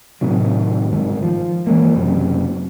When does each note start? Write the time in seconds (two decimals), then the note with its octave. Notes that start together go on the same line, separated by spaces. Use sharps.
0.21 A2 C3 D#3 F#3
0.91 G1 G#2 D#3
1.23 F3
1.67 E3 G#3 A#3
1.95 F#1 F#2 C3